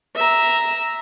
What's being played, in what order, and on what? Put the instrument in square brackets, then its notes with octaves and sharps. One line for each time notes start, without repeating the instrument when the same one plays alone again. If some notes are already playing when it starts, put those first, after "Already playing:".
[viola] E5 A#5